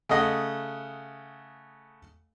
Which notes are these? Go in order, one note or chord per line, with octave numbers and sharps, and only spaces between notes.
C#3 A3 D#5 F#5